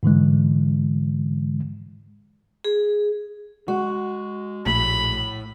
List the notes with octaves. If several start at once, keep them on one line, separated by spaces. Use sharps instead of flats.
G#2 D3 E3 G#3
G#4
G#3 F#4
A#1 A2 B5